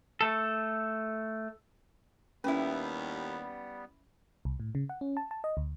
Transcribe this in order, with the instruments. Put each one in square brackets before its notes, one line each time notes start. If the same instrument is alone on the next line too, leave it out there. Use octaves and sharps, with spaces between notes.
[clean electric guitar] A3 A4
[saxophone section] D#2 [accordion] G3 B3 [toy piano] C#4 [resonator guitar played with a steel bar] E4 B4
[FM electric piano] C2
A2
C#3
F#5
C#4
A5
A5
D#5
D2